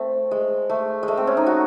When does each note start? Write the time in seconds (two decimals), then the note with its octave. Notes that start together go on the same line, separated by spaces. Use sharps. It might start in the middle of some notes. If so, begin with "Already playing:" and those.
Already playing: A3 C4
0.31 G#3
0.70 A3
1.03 G#3
1.08 A3
1.17 C4
1.27 C#4
1.37 D#4
1.47 F#4